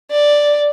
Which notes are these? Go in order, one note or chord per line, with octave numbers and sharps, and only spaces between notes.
D5